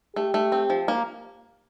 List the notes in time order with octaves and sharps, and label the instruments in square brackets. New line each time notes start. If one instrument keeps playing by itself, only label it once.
[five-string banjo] A3 [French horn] G4
[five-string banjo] A3
C4
F3
A#3